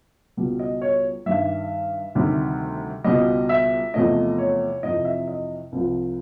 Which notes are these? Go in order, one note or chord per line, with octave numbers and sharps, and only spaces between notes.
C#2 B2 G3
D#5
C#5
G2 D#3 G3 E5
D2 C3 D#3 G3
C#2 B2 G3 D#5
E5
E2 C3 F3 A3 D#5
C#5
F2 C3 E3 D#5
E5
D#5
C2 C3 F3